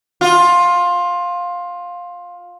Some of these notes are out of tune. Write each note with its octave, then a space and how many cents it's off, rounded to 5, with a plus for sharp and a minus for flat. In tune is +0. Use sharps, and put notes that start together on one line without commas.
F4 +15